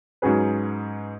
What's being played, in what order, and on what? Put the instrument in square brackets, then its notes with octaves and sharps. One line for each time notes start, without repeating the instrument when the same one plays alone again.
[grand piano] G#2 F#3 C#4 G#4 B4